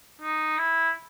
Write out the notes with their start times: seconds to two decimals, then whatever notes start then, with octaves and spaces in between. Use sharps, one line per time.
0.22 D#4
0.58 E4